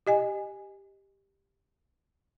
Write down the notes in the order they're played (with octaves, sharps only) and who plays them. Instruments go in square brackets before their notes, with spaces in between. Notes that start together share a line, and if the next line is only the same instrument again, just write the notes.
[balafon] G4 D#5 G#5